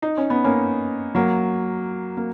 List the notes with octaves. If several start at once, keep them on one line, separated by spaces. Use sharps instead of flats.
D#4
C#4
B3
A#3 C#4
F#3 A#3
A#3